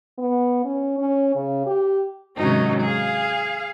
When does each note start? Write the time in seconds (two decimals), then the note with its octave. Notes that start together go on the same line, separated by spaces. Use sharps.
0.18 B3
0.65 C#4
0.98 C#4
1.35 C#3
1.66 G4
2.38 G#2 C3 D#3 F#3 C#4 D#4
2.81 G#4 F5